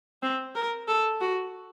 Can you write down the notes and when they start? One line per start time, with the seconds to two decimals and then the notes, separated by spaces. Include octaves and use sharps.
0.23 C4
0.55 A#4
0.88 A4
1.21 F#4